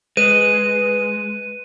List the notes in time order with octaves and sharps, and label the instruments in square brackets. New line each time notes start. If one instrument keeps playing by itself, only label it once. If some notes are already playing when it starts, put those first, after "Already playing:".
[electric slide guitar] G#3 [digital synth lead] B4 [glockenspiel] D#7